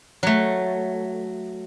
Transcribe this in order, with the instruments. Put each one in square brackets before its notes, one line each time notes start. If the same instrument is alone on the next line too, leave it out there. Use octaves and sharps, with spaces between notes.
[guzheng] F#3 A3